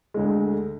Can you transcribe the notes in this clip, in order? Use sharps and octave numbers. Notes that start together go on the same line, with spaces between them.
D2 D3 G#3